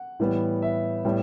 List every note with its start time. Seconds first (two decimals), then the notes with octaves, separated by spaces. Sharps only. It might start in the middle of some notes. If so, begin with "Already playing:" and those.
Already playing: F#5
0.19 A2 E3 G3 B3
0.62 E5
1.05 A2 G3 B3